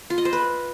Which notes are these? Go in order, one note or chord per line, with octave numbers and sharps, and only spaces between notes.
F4
D#5
C5
B4